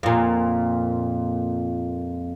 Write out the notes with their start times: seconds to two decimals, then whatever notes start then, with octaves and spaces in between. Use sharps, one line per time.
0.03 F2 A#2